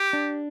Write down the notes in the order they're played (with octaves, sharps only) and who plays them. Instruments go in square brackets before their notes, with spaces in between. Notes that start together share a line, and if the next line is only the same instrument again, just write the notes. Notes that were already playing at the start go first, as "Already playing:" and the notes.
Already playing: [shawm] G4
[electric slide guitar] D4